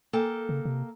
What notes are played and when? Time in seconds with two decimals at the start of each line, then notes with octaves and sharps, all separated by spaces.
0.13 A#3 A4 G5
0.49 C#3
0.65 C3